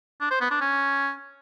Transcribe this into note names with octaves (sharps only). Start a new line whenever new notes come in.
D4
C5
B3
D4
C#4